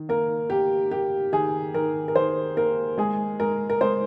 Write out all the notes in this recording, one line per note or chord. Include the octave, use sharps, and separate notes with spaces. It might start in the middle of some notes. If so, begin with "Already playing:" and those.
Already playing: D#3
A#3 A#4
A#3 G4
A#3 G4
D#3 G#4
D#3 A#4
A#4
D#3 C5
A#3 A#4
G#3 G#4
G#3 A#4
A#4
G#3 C5